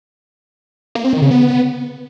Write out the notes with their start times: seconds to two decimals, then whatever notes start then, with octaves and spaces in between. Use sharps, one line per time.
0.95 A#3
1.04 C4
1.13 D#3
1.22 C#3
1.31 B3